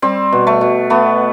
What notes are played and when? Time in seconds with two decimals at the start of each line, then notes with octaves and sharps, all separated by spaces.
0.02 G3 C4
0.32 B2
0.47 A3
0.61 B2
0.90 A3 B3